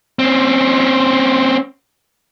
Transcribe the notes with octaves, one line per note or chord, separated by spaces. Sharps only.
C4 C#4